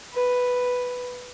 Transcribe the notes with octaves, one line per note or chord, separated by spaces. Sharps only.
B4